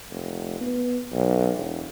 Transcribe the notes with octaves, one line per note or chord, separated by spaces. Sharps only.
F1
B3
B1
E1